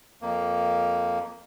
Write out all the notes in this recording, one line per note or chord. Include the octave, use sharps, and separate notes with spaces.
F2 A#3